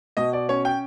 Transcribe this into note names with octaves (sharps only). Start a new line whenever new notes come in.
B2 D#5
D5
C#4 C#5
G5